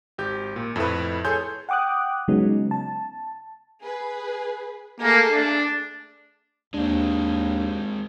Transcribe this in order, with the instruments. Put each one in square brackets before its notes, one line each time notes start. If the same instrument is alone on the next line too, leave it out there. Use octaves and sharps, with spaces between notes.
[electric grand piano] G#1 G4 G6
A#2
F2 A2 E4 B4
G#4 A4 C#5 G#5 C6 G6
[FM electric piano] F#5 G5 D6 D#6 F#6
C#3 F#3 G#3 B3 C#4 D#4
A5
[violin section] G#4 B4
[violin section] A3 G#4 A4 [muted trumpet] A#3
[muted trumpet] D4
[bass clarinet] D#2 [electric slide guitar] G#3 C4 [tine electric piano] D4